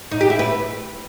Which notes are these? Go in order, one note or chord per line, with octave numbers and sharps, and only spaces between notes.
D#4
G4
E4
B4